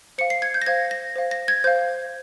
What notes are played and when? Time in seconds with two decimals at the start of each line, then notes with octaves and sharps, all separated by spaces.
0.18 C5 F5 C#7
0.30 C7
0.42 G#6
0.54 G6
0.62 A#6
0.66 C5 F5 G#6
0.91 A#6
1.16 C5 F5
1.31 A#6
1.48 G#6
1.64 C5 F5 G6